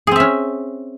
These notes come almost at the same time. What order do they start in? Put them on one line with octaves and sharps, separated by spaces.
G#4 C4 E5 C#4